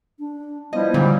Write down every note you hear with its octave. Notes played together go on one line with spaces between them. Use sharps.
D4
F3 G3 B3 E4 D#5
A#2 D3 F#3 G4